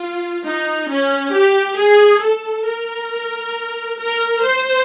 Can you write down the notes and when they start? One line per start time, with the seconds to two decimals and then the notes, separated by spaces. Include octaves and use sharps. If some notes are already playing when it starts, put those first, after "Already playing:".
Already playing: F4
0.44 D#4
0.89 C#4
1.32 G4
1.76 G#4
2.21 A4
2.65 A#4
3.98 A#4
4.42 C5